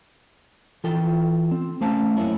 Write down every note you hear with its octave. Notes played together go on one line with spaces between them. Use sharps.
E3 F4 A4 G5
C4
A3 C#4 C5 F5 A5
F#2 A#3 C#4 E4